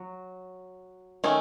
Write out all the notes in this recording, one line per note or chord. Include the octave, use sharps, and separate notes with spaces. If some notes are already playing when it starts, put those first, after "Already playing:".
Already playing: F#3
D#3 A3 C#4